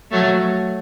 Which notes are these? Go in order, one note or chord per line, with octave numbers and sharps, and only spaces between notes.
F#3 A3